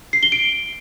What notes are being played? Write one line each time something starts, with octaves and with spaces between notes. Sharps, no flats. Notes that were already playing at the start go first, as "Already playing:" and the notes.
C7
G7
D7